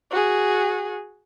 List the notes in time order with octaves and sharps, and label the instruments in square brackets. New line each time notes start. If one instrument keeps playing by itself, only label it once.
[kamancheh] F#4 G#4